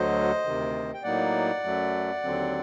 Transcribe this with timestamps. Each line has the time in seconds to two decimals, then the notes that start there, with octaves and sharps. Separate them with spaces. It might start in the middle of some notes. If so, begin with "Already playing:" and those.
Already playing: D2 D3 F#3 C5 D#5
0.44 D2 C3 D#3
0.94 G5
1.03 A2 F#3 A#3 D#4 D5 F#5
1.64 F#2 F#3 A3
2.23 D#2 D3 F#3 C4